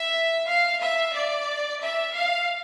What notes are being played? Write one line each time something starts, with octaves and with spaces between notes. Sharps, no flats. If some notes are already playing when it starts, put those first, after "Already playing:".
Already playing: E5
F5
E5
D5
E5
F5